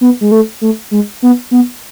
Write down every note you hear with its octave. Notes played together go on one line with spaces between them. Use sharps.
B3
G#3
A3
A3
G#3
B3
B3